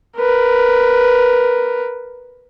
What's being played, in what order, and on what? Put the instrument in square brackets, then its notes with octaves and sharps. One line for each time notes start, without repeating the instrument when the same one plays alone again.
[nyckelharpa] A#4 B4